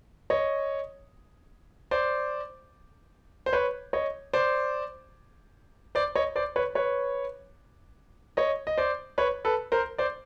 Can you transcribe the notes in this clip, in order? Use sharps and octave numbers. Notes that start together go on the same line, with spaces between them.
C#5 D#5
C5 D5
C5
B4 C#5
C#5 D#5
C5 D5
C5 D5
C#5 D#5
C5 D5
B4 C#5
B4 C#5
C#5 D#5
D#5
C5 D5
B4 C#5
A4 B4
A#4 C5
C5 D5